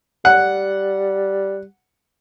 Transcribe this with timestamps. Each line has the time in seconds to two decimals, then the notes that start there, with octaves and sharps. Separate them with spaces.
0.25 G3 F#5